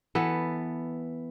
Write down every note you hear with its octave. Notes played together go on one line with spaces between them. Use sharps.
E3 B3 A4